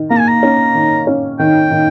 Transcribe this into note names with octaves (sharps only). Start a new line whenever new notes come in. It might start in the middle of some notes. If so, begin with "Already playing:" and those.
Already playing: D#3
A#3 A#5
G#5
A#5
C#4
D#3
C#4
D#3 G5
D#3